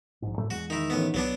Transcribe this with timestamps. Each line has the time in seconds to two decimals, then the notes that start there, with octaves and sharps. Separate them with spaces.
0.22 A#1 G#2
0.37 F#2 A2 A3
0.50 E2 G#3 F#4
0.70 D#3 D#4 E4
0.90 A1 B3
1.14 C2 F#3 B3 D4